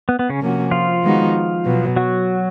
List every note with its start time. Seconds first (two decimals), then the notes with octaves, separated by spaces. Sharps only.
0.09 B3
0.19 B3
0.30 C#3 C#4
0.40 C3 F3 A#3 C#4 F#4
0.71 F3 F4
1.03 D#3 G#3 B3 D#4 F#4
1.65 B2 F#3 B3
1.96 F#3 F#4